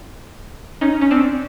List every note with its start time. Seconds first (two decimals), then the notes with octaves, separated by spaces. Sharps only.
0.81 C#4 D#4
1.01 C#4
1.11 C4 D4